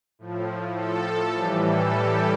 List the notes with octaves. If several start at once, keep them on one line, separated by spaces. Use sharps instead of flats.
A2 F3
A4
A2 E3 G3 G4
A4
G4